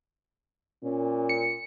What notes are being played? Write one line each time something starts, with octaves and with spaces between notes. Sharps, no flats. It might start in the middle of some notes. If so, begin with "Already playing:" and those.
A#2 C#4
C#7